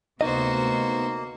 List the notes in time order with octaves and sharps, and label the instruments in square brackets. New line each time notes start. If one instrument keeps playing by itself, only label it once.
[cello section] D2 C3 [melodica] A#3 [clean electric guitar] B3 D#4 D#5 [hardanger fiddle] F#4 C5